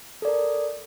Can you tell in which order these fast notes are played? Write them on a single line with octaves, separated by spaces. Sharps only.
A4 D5 A#4